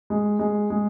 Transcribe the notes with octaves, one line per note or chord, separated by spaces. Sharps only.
G#3
G#3
G#3